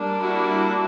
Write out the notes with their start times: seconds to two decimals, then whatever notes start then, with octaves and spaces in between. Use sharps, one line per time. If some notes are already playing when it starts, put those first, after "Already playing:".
Already playing: G3 A#3 D4
0.18 E4 F#4